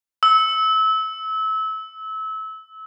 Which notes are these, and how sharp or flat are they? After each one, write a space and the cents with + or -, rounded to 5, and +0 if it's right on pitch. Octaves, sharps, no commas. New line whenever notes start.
E6 -25